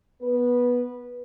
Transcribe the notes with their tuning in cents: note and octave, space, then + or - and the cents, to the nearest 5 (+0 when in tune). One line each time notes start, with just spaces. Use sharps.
B3 -10 B4 -15